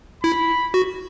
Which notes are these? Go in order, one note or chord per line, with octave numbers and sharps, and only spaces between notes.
E4 B5
F#4